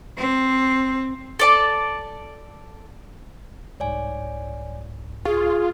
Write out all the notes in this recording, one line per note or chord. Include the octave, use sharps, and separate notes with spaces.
C4
A4 D5 A5
C2 G#2 C#5 D5 G#5
F4 G#4 C#6